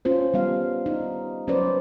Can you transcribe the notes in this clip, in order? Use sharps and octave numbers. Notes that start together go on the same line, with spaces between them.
C#4 F4 C5
G3 B3 F5
D#4
F#3 C#4 B4 C5 D5